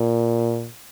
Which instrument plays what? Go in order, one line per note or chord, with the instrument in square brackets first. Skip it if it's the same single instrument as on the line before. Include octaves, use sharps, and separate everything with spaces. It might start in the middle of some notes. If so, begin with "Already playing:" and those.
Already playing: [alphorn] A#2